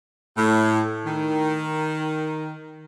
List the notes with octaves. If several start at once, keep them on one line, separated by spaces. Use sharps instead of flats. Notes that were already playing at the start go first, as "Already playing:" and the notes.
A2
D#3